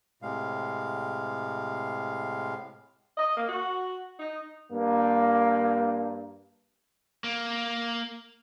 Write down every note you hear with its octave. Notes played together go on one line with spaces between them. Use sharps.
A2 C3 G#3 F5
D#5
A#3
F#4
D#4
G2 A#3
A#3